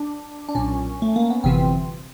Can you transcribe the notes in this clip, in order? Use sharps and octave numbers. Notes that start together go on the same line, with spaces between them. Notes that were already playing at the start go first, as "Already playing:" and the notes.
Already playing: D4
D4
B1 A#2 C#4
A3
A#3
B3
G1 F2 C3 E3 C4